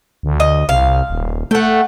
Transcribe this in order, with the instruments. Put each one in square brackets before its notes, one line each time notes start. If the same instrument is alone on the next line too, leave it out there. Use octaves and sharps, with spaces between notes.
[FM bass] D2
[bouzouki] D#5
[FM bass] C2 [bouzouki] F5
[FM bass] D#1
[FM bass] A3 [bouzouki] F#5 G5